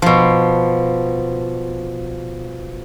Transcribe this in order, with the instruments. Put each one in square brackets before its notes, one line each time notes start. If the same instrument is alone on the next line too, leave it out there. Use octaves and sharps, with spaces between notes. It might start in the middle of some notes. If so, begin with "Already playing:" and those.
[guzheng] B2 F3